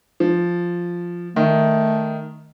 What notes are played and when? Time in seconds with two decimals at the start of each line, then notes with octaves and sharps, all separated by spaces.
0.20 F3
1.36 D#3 A3